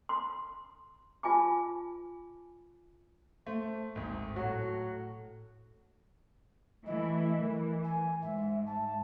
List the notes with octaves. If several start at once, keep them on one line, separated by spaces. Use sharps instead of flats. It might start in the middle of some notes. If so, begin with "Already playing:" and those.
C6
F4 G#5 A5 D6
A3 C5
G#1 D2 D#3
A2 F#3 F#4
E3 A3 E4 D#5
E3 A#4
G#5
G#2 E5
A5